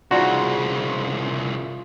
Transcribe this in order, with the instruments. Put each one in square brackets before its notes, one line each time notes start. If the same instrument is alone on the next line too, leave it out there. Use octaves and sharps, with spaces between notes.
[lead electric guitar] C2 C#3 [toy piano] D#4 D5 A#5 [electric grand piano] F4 C6 [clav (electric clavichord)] F#4